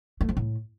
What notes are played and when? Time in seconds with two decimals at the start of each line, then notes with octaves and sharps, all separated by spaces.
0.21 A3
0.29 F3
0.37 A2